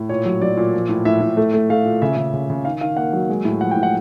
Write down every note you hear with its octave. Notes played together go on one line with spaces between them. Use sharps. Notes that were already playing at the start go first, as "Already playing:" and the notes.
Already playing: A2
A#2 C#5
F#3
F#3 D5
A#2
F3
A2
A2 E5
A2
A3
A3
A3 F5
A#2
C#3 E5
C#3
C#3
C#3
D#3 F5
D#3 F5
A#3 F#5
F#3
G#3
A2
F3 F#5
G5
A2
F#5